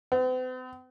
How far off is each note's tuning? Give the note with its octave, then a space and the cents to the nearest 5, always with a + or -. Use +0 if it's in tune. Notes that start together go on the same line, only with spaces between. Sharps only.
C4 -45